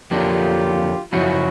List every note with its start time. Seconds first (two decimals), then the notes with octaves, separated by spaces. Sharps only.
0.11 F2 D3 F#3 A#3 D4 F4 G4
1.12 F#2 C#3 F3 G#3 C#4 E4 F#4